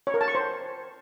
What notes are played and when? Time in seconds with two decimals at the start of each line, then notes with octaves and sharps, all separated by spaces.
0.07 C#5
0.14 A#4
0.21 A5
0.28 C#6
0.35 C5